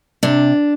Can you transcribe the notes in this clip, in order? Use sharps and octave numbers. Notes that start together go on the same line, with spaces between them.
C3 D4